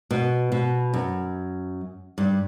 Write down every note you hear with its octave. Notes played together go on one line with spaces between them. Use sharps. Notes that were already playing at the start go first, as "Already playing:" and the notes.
B2
B2
F#2
G2